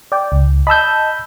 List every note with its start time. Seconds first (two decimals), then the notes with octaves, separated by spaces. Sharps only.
0.12 D5 G5
0.32 C#2
0.67 D#5 A5 B5 E6 G6